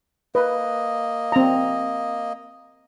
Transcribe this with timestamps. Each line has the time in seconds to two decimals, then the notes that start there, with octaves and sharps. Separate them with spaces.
0.35 A#3 B4 D#5
1.32 C4 A#5